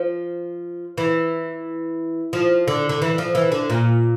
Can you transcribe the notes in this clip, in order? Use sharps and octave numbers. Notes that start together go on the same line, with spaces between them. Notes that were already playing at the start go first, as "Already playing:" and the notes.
Already playing: F3
E3
F3
D3
D3
E3
F3
E3
D3
A#2